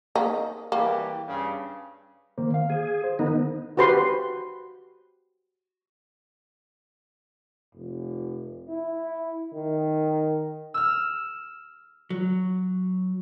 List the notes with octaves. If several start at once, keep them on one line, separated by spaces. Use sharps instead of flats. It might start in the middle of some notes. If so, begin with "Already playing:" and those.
A#3 D#4
E3 G3 A#3 G4
G2 C#3
D#3 A#3 C5
F5
G#4
C5
D#3 B3 D#4
F#4 G4 B4 C5 C6
F1
E4
D#3
E6 F6
F#3